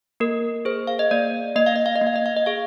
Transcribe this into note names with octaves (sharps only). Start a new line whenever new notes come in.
A#3 A#4
G#4 C5
F5
D#5
A#3 D5
A#3 D#5
F5
D#5
F5
D#5
A#3
F5
D#5
F5
D#5
G#4 F5